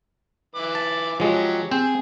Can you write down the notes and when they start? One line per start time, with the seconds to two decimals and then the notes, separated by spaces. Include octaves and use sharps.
0.55 E3 B4 D6
0.75 A5
1.20 F3 F#3 G#3 C#4 G4
1.71 C4 G#4 C5